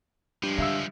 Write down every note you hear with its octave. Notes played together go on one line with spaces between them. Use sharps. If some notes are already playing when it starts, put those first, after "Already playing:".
G2 F3 G#3
D3 E5 F5 E6